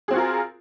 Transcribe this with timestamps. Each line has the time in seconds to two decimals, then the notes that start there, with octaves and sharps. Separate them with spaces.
0.08 G#4
0.11 C4
0.13 F#4
0.16 F4
0.18 A#4